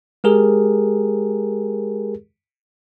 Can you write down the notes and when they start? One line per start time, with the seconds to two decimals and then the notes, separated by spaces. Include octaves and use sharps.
0.24 G#3 G4 G#4 A#4